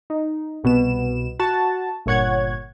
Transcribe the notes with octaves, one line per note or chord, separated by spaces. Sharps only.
D#4
C2 B2 B3 E7
F#4 A5
G1 A#2 C#5 F#5 G#6